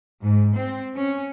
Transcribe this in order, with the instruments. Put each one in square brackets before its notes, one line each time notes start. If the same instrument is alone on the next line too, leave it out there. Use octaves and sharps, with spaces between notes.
[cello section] G#2
C4
C#4